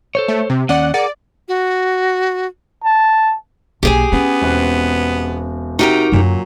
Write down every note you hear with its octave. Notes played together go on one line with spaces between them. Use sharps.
A4 C5 C#5
A3
C3
D#2 C#4 D5 F#5
G#4 A#4 D5 F#5
F#4
A5
B1 A#3 G4 G#4 G#5
B3 C#4
E1 C4 F#6
C3 D#4 F#4 G4 A#4
F#2 A#2 D3 F#3